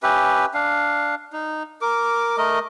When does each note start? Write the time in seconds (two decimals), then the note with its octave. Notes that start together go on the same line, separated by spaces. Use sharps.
0.03 C#4 G4 B4 E5
0.54 D4 F5
1.33 D#4
1.81 A#4 D6
2.38 A3 A#4 D#5